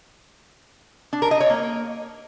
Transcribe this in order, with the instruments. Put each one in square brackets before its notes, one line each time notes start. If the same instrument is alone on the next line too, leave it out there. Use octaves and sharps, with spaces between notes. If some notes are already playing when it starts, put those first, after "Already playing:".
[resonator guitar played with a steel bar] D4
A#4
D#5
C#5
A#3